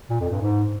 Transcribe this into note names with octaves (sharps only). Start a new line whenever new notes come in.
A#2
F2
G2
G#2